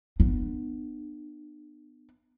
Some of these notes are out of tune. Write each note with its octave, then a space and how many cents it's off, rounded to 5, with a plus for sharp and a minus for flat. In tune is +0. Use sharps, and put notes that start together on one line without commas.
B3 +0 D4 +40